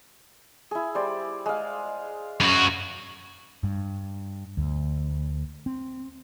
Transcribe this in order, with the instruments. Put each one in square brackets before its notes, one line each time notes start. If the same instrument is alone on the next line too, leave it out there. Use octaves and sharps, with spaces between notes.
[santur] E4 G#4
G3 C5 D5
G#3 F5
[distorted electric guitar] F#2 F#4 [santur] B5
[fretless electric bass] G2
D2
C4